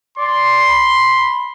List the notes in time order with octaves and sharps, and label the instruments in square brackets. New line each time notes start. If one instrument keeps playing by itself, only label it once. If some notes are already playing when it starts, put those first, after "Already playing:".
[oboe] D5 [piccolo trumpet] C6
[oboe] B5